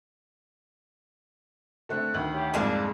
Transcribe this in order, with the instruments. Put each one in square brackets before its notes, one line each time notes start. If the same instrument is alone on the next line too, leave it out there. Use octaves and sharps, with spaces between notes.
[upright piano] D3 A3 C4 [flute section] F#6
[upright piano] D2 D#3
[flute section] G4 C#5 E5
[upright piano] C2 F2 G#2 [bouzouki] A#3 D4 G#4 [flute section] A5